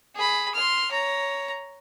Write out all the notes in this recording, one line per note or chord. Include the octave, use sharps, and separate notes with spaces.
G#4 B5
C6 F6
C#5 A#5